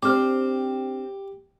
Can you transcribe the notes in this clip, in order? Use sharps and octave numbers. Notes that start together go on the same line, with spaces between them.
C4 D4 G4 C5 D6 F6